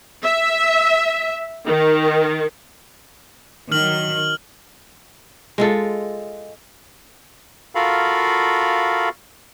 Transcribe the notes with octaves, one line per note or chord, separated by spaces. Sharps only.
E5
D#3
D#3 F#3 F6 F#7
G#3 F4 A4
F4 F#4 A4 A#4 F5 B5